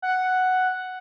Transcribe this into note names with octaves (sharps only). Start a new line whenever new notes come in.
F#5